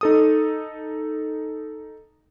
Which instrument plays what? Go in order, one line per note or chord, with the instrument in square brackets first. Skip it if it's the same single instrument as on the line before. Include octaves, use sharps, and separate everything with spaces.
[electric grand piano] D#4 A4 D#6